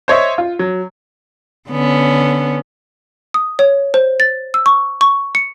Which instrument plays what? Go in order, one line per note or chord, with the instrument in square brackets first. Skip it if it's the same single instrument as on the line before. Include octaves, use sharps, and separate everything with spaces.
[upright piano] C5 C#5 D#5 E5
F4
F#3
[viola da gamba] D3 B3 C#4
[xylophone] D#6
C#5
C5
A6
E6
C#6
C#6
C#7